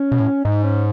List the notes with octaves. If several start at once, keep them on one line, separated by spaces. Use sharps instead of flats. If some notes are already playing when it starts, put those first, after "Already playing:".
Already playing: C#4
B2
A2
G#2 D#4
C#4